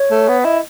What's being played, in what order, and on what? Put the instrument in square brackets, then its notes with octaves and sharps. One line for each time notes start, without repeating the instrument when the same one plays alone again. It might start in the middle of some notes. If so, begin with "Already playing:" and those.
Already playing: [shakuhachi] C#5
[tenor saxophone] A3
B3
[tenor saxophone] E4 [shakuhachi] D#5